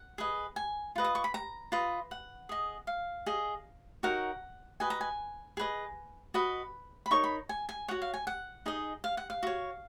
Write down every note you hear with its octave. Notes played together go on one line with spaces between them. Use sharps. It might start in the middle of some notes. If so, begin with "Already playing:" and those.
Already playing: F#5
G#4 B4 D#5
G#5
F4 B4 D#5
D#6
C#6
B5
A#5
F4 B4 D#5
F#5
G#4 D#5
F5
G#4 D#5
D#4 F#4 A#4 C#5 F#5
F#4 B4 D#5 G#5
A#5
G#5
G#4 B4 D#5
F#4 B4 D#5 B5
B5
D#4 A#4 C#5 C#6
B5
G#5
G#5
F#4 C#5 F#5
F5
G#5
F#5
D#4 G#4 D#5
F5
F#5
F5
F#4 C#5